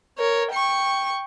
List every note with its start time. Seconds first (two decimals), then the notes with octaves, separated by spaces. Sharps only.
0.18 A#4 C#5
0.52 G5 C#6